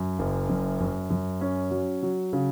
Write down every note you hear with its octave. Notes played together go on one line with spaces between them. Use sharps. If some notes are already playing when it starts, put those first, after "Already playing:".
Already playing: F#2
F#1
F#2
F#2
F#2
C#4
F#3
F#3
C#3